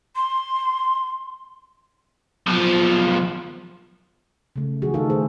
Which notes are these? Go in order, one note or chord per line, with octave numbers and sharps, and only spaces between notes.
C6
B1 F3
C#3 A3
E3 F3 F4 F#4 G#4
D#3 A3 D#4 A4 F5
G#3 A3 D#4 G#4 C5